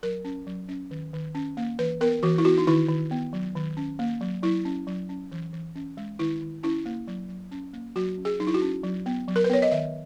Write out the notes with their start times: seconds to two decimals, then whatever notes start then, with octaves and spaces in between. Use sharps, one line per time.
0.03 F#3 A#4
0.25 C#4
0.47 F#3
0.69 C#4
0.91 D#3
1.13 D#3
1.35 C#4
1.57 A#3
1.79 E3 B4
2.01 B3 A#4
2.23 E3 F#4
2.38 E4
2.45 B3 F#4
2.58 D#4
2.67 D#3 E4
2.88 D#3
3.11 B3
3.33 F#3
3.55 D#3
3.77 C#4
3.99 A#3
4.21 F#3
4.43 F#3 E4
4.65 C#4
4.87 F#3
5.09 C#4
5.32 E3
5.53 E3
5.76 C#4
5.97 G#3
6.19 D#3 E4
6.42 D#3
6.63 C#4 E4
6.86 A#3
7.08 F#3
7.29 F#3
7.51 C#4
7.73 A#3
7.96 F#3 F#4
8.18 C#4
8.25 G#4
8.40 F#3 D#4
8.47 E4
8.54 F#4
8.62 C#4
8.84 F#3
9.06 B3
9.28 F#3
9.36 A#4
9.44 B4
9.50 B3 C#5
9.62 D#5
9.72 D#3 E5